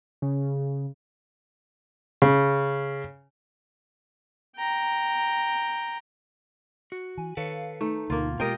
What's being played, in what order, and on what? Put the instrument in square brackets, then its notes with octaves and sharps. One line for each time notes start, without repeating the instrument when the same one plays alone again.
[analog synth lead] C#3
[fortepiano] C#3
[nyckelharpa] G5 A#5
[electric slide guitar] F#4
[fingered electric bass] E3 [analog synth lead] G#5
[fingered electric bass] D#3 [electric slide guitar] A4 B4 C#5 [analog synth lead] F5
[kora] A3 [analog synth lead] D#4
[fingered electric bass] D2 [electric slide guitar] B2 [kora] A#3 F4
[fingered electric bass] B2 G#3 [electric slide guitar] F4 G4 [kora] A#4 D#5 G5